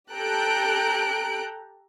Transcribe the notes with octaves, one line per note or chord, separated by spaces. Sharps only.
G4 A4 A#5 F#6 G6 D7